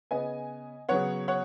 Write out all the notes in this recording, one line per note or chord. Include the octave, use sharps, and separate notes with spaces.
C#3 B3 D#5 G#5
C#3 F#3 B3 C#5 F#5
C#5 F#5